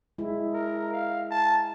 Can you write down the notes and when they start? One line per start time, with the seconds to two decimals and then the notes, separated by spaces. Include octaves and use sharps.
0.18 G#3 E4
0.54 A#4
0.92 F5
1.31 A5